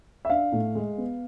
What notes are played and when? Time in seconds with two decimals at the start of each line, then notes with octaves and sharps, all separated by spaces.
0.25 E5
0.30 D4 F5
0.52 A2
0.75 G#3
0.98 B3